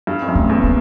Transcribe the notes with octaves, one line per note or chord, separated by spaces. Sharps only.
G2
F2
F#2
A3
E2
A#3